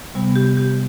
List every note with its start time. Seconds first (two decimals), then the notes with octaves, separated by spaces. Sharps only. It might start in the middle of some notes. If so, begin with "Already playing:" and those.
0.15 C3 G3 B3
0.36 G4
0.57 G4